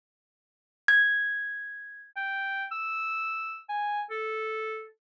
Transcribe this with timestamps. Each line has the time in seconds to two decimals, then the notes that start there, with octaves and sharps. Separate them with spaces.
0.88 G#6
2.17 G5
2.72 E6
3.69 G#5
4.11 A4